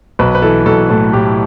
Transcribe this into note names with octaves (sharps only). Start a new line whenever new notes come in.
B1 B4
B4
E3 A4
B1 A4
A2 A4
A2 G4